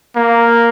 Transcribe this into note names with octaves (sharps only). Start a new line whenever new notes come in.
A#3